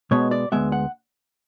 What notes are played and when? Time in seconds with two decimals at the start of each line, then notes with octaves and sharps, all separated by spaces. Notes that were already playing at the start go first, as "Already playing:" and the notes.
0.11 B2 G#3 B3 C#5
0.31 D5
0.52 D2 C#3 G#3 B3 E5
0.72 F#5